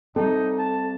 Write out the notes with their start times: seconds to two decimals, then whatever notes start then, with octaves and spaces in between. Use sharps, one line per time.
0.16 G3 C4 D#4 A4
0.58 A5